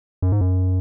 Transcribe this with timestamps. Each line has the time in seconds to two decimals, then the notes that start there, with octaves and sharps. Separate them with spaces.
0.22 F#2
0.32 G#2
0.41 F#2